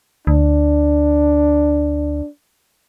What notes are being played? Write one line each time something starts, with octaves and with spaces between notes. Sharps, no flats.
D2 D4